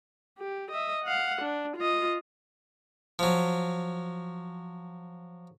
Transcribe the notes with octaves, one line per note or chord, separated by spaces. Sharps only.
G4
D#5 E5
F5 F#5
D4
F4 D#5
F3 F#3